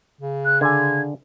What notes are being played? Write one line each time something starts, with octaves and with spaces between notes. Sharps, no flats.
C#3
F#6
D3 G#5 G#6